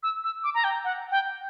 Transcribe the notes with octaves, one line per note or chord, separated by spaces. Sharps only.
E6
E6
D6
A#5
G5
F#5
G5